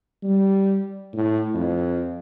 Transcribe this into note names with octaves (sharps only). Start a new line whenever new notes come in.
G3
A2
F2